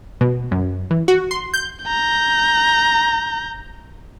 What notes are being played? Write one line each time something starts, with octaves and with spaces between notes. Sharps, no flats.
B2
F#2
E3
F#4
C6
G6
A#5 G6